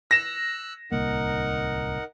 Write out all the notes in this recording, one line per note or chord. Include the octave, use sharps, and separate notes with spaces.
E6 F#6 A#6 E7
D1 C2 A#3 D#4 A#4 F#5